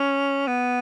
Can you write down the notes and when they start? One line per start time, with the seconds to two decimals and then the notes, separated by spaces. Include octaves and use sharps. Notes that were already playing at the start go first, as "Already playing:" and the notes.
Already playing: C#4
0.47 B3